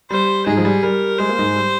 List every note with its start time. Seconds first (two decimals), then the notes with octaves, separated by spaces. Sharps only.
0.10 G3 C5
0.46 G#2 G#3 G#4
0.57 F3
0.65 G3
0.83 G3 A#4
1.19 G#3 C5
1.29 A#3
1.38 G#2 G#3
1.55 G3